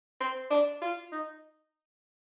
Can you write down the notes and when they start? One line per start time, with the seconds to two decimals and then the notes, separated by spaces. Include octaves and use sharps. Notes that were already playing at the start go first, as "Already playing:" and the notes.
0.20 C4
0.51 D4
0.82 F4
1.12 D#4